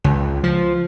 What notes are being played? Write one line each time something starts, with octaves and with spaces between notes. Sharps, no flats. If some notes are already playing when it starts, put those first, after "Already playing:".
C#2
F3